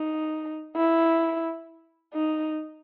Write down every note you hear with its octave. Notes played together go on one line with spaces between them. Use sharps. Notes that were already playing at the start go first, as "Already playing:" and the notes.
Already playing: D#4
E4
D#4